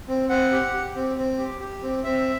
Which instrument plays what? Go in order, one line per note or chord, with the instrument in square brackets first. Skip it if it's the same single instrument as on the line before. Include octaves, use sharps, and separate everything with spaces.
[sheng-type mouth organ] C4
C4 F#5
G4
G4
C4
C4
G4
G4
C4
C4 E5